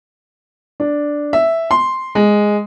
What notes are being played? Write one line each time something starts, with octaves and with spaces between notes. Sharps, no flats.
D4
E5
C6
G#3